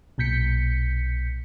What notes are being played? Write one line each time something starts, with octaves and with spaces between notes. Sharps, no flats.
B1 A#2 G6 B6 C#7